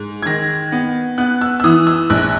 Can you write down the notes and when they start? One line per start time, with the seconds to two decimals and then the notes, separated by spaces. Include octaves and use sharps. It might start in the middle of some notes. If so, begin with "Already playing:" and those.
Already playing: G#2
0.22 G#6
0.26 D#3 A#6
0.72 B3
1.18 B3 F#6
1.41 E6
1.60 E6
1.64 E3 D#6
1.87 E6
2.10 A#1 F#6